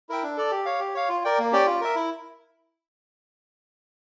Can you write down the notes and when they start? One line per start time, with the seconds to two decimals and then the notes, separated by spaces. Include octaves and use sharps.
0.09 E4 A#4 E5 G5
0.23 D4
0.37 A4 D5
0.51 G4
0.65 C#5 F5
0.80 G4
0.94 C#5 F5
1.09 F4
1.24 A#4 D5 G5
1.39 A#3
1.52 C#4 G4 D5 G5
1.66 F4
1.81 A#4 E5
1.95 E4